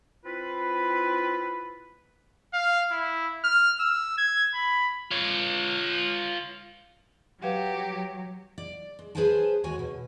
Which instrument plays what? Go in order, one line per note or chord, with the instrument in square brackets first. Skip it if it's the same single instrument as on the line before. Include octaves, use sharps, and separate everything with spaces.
[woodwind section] C4 E4 F4 B4
[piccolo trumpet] F5
E4
F6
E6
G#6
B5
[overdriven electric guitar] F4 C#5
[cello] F#3 [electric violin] G4 [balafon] B4 F5 F#5
[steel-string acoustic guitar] D5
G#3
G#4 B4 C5 F5 G#5 A5
D#2 G#3 F#4 C#5 G#5
B2